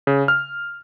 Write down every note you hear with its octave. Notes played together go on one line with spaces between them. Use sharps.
C#3
F6